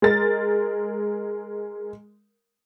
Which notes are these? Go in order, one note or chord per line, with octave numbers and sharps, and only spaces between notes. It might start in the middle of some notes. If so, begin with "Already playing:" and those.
G#3 A#4 A6